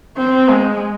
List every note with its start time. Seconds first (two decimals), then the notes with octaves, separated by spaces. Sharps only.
0.17 C4
0.49 G#3